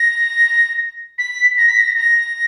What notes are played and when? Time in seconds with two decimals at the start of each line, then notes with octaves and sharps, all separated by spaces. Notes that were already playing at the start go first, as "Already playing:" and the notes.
Already playing: A#6
1.18 B6
1.57 A#6
1.68 B6
1.78 A#6
1.97 A#6